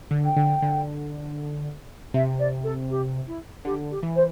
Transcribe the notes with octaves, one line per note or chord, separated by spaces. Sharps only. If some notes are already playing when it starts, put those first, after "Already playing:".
D3
G5
D3
D3
C3 E5
D5
A4
G4
E4
D3 G4
G4
E3
C5